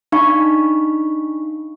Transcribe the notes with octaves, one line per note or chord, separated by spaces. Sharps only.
D4 D#4 F5 B5 C#6